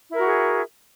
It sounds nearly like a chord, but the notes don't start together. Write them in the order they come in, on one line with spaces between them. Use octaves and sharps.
E4 A#4 F#4 G#4